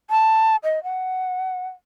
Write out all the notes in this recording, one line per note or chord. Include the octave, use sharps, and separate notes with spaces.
A5
D#5
F#5